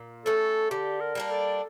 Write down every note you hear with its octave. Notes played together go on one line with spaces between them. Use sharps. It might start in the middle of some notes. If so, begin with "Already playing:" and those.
Already playing: A#2
A3 C#4 A4
D3 G4
A#4
G3 A#3 D4
A4